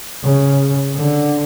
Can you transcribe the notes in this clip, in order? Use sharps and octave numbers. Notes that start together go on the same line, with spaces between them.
C#3
D3